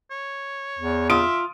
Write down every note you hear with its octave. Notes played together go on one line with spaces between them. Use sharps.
C#5
E2
F4 E5 D#6 D7